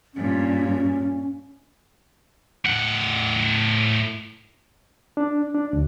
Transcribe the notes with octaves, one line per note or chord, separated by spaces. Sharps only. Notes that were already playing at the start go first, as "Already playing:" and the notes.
G2 A#2 C#4
A2 F#5
D4
D4
D2